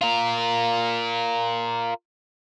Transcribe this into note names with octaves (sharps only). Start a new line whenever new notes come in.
F4 A#4